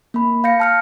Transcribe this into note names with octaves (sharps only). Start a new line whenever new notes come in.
A#3 B5
F5 G6 A#6 C#7
A5 F6 C#7